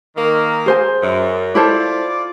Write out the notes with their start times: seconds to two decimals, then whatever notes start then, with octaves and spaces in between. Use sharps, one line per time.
0.16 D#3 A#3
0.66 G#4 C5 G#5
1.03 F#2
1.55 E4 F4 A4 C5 D5